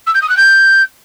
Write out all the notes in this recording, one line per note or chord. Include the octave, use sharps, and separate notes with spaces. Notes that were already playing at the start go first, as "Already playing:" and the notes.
E6
G6
D#6
F#6
G6